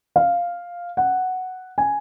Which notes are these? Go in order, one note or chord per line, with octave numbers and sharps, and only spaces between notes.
F5
F#5
G#5